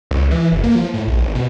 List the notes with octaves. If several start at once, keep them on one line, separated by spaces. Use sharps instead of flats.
C#2
E3
F#1
A#3
F3
A2
A#1
G#1
B2